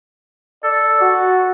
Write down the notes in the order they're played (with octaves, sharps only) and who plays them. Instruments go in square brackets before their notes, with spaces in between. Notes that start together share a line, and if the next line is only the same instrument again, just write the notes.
[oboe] A4 [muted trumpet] D5
[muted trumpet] F#4